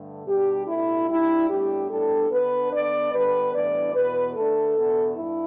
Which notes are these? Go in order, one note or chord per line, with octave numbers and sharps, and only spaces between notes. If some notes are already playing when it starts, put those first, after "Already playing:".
Already playing: G2 D3 A3
B2 G3 D4 G4
B2 A3 D4 E4
G2 G3 D4 E4
A2 G3 B3 D4 G4
A2 G3 B3 D4 A4
D3 B3 D4 B4
D3 B3 D4 D5
D3 G3 B3 D4 B4
A2 E3 G3 B3 D4 D5
E2 B2 B3 B4
D3 A3 D4 A4
E2 B2 B3 D4
G2 E4